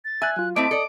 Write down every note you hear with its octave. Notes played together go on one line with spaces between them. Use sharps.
A6
E5 G#5 F#6
F#3 F4 F#6
A3 C4 E4 D#5 A5 D6
A4 D5 D#6